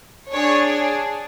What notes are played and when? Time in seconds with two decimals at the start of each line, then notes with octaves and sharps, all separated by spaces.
0.32 D4 G#4 C#5